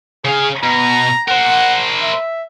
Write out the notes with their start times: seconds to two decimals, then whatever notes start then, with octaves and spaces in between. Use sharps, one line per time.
0.25 C#3 G#4 F5
0.63 B2 A#5
1.28 A#4 C5 F#5
2.02 E5